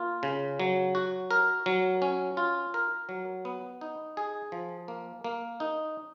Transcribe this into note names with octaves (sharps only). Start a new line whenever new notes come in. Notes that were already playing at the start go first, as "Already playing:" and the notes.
Already playing: A#3 F4
C#3
F#3
F#4
A#4
F#3
C#4
F4
A#4
F#3
B3
D#4
G#4
F3
A#3
A#3
D#4